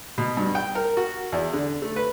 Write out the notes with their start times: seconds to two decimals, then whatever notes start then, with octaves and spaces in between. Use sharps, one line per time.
0.18 B2
0.37 G2
0.55 G5
0.75 A#4
0.97 F#4
1.32 E2
1.53 D3
1.82 A3
1.96 B4